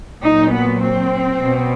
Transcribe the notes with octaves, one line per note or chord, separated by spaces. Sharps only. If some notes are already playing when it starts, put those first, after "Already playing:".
A#2 F#3 D#4
B3
C4
B2 F#3